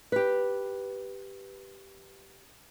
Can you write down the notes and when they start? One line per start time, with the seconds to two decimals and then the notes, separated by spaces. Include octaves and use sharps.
0.12 G4 B4